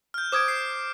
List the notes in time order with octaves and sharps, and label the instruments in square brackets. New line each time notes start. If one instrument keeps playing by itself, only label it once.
[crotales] F6 G6
[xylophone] C5 D#6 G#6 [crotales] D6 D7
[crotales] C7